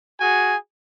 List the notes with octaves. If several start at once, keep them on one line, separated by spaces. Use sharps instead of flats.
F#4 G#4 G#5